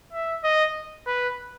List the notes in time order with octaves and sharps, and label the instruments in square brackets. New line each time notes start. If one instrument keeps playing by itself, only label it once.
[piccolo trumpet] E5
D#5
B4